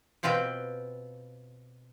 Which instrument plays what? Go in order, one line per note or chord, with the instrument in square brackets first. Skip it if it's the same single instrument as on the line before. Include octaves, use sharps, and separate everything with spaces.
[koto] B2 C4 F4 B4 G5